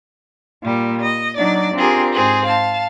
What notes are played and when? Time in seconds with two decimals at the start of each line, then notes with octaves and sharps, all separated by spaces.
0.62 A#2 G3
1.02 D#5
1.38 F#3 D4 D#4 D5
1.75 C4 D4 F4 G4 G#4 A#4
2.12 G#2 C4 G#4
2.45 F5 A5